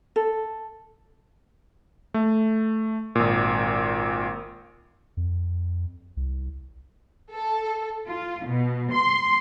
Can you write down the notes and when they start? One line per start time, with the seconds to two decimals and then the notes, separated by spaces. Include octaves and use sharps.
0.16 A4
2.14 A3
3.15 G#1 A#2
5.17 F2
6.17 C2
7.33 A4
8.06 F4
8.45 B2
8.92 C6